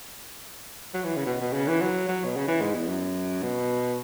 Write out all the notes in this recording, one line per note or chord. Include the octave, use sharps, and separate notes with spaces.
F#3
E3
C#3
B2
B2
C#3
E3
F#3
F#3
B2
C#3
E3
G#2
E2
F#2
B2